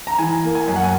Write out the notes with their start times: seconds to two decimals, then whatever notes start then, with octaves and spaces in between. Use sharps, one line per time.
0.07 A#5
0.19 E3 G#5
0.43 A#3
0.55 G#5
0.68 F#2
0.76 F#5
0.84 G#5